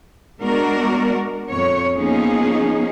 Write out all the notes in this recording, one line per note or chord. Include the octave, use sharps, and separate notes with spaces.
G#3 B3 D4 F#4 A#4 D5
F2 C#5
F3 A#3 B3 C#4 D#4 G#4